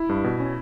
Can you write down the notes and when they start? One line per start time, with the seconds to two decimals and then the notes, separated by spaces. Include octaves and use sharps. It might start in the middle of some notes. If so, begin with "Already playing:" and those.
Already playing: E4
0.09 G2
0.24 B2
0.40 C#4